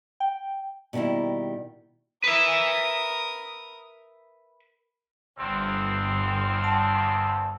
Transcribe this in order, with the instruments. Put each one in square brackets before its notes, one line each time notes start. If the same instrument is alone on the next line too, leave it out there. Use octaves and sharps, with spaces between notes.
[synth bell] G5
[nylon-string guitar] B2 D#3 G3 A#3 E4
[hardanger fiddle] A#4 D#6 [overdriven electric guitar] B4 E5
[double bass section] G1 [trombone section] E2 C4
[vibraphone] F#5 A5 E6